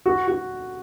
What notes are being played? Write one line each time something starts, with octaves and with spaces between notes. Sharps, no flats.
F#4
F#4